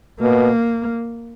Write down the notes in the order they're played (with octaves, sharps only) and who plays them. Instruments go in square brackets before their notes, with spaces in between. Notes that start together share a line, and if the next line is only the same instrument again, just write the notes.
[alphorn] B2 [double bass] A#3